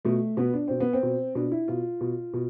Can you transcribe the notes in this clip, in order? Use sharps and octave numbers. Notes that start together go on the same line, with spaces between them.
B2 A3
B2 B3
D4
B2 C4
B3
C4
B2
B2 D4
E4
B2 F4
B2
B2